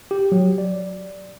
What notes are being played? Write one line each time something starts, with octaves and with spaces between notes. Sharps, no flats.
G4
F#3
D5